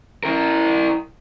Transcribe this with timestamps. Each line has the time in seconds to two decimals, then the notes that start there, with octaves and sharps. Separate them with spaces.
0.24 E4 A#4